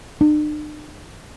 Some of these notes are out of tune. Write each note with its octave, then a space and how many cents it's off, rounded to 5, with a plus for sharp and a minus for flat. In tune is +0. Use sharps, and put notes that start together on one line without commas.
D4 +45